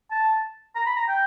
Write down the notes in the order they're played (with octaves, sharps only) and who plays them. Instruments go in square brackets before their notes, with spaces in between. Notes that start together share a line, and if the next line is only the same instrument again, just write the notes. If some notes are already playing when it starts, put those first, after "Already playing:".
[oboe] A5
A#5
B5
A#5
G5